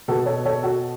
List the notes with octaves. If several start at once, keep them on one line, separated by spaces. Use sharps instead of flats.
B2 F#4 A4
A4 C#5
A4 C#5
F#4 A4